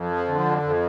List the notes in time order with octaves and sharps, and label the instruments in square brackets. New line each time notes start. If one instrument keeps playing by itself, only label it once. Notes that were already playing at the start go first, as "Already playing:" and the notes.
Already playing: [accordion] F2
F3
D3
F2
F2